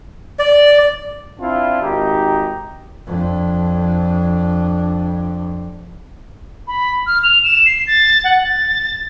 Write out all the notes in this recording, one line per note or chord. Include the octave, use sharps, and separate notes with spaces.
D5
C4 D4 E4 F4
G#1 D#4 G4
F2 D4
B5
F6
F7
E7
C7
A6
F#5
A6